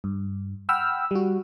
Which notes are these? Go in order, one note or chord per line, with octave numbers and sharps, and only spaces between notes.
G2
F#5 G5 B5 E6 F6
G3 F#4